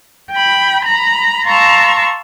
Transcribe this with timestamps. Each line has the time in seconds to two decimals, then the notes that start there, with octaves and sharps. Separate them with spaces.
0.33 G5 B5
0.86 A#5 B5
1.47 F5 A5 A#5 C6 C#6 E6